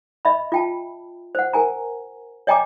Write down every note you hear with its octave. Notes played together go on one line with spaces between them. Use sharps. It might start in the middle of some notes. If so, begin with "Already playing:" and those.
D#5 E5 B5
F4 G5 A5
C5 F#5
A#4 G#5 A#5
C#5 D#5 G5 G#5 A#5 D6